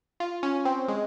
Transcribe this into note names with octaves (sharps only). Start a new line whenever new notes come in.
F4
C#4
C4
G#3